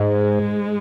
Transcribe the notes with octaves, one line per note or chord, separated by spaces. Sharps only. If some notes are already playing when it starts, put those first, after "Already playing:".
Already playing: G#2 G#3